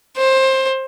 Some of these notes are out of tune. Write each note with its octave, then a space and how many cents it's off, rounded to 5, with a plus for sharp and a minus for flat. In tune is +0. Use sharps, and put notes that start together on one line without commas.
C5 +20